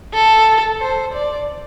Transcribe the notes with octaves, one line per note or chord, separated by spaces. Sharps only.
A4
C5
D5